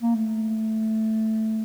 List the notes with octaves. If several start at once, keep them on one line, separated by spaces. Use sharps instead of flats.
A#3
A3